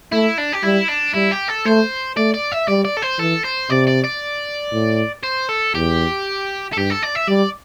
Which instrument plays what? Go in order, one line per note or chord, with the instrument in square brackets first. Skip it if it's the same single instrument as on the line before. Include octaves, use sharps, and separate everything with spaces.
[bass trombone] A3 [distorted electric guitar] E4
[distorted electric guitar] D4
G4
[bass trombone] G3 [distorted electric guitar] E4
[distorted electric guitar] D4
[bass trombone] G3 [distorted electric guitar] E4
[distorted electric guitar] G4
A4
[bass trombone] A3 [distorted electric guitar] C5
[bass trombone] A3 [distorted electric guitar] D5
[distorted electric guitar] D5
E5
[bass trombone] G3 [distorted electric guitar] D5
[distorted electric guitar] D5
A4
C5
[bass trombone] E3 [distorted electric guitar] A4
[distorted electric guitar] C5
[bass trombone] C3 [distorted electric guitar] D5
[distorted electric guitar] D5
D5
[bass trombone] A2
[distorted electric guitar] C5
A4
[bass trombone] E2 [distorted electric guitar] G4
[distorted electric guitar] A4
[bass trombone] G2 [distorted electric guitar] G4
[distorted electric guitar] A4
D5
E5
[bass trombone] G3 [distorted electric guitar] D5